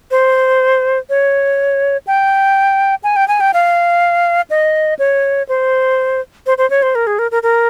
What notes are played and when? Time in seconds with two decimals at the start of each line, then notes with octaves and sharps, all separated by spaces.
0.11 C5
1.10 C#5
2.07 G5
3.04 G#5
3.16 G5
3.28 G#5
3.40 G5
3.54 F5
4.50 D#5
4.99 C#5
5.49 C5
6.46 C5
6.58 C5
6.70 C#5
6.82 C5
6.95 A#4
7.07 G#4
7.19 A#4
7.31 A#4
7.43 A#4